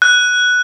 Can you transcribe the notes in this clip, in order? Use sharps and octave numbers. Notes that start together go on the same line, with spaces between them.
F#6